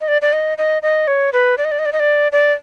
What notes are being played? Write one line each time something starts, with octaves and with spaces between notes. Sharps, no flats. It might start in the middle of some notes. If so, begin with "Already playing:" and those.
D#5
D5
D5
D#5
D#5
D#5
C#5
B4
D5
D#5
D5
D#5
D5
D#5
D5
D5